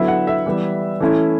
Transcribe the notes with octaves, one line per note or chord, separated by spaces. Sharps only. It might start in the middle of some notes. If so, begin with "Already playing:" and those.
Already playing: D3 F#3 B3 E4 E5
F#5
E5
E3 G3 B3
E3 A3 C#4 E4